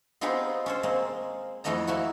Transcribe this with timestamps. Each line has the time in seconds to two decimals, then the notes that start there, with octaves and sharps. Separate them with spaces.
0.21 B3 C4 D#4 F4 G4 G#4
0.66 C#4 A4 C5
0.83 G#3 A#3 C4
1.64 F2 E3 A3 B3 D#5 A#5
1.87 A3 A#3 E4 F#4